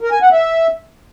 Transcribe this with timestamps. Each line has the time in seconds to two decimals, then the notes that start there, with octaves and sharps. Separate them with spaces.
0.01 A#4
0.11 G#5
0.22 F#5
0.32 E5